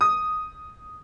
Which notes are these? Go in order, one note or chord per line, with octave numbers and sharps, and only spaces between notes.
D#6